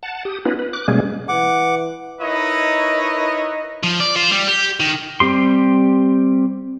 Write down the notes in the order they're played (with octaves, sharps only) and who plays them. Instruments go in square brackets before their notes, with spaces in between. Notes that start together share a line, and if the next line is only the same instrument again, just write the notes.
[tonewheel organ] F#5 A5
G4 D#6
B3 C#4 D#4 F4 B4
B4
D6 F#6
B2 G3 G#3 A#3 C#4 G#4
[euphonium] E3 [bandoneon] F#5 D6
[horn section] D#4 E4 A#4 B4 C#5 D#5
[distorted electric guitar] F3
D5
F4 C5
G3
G4
D#3
[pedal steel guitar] G3 C4 G4 C6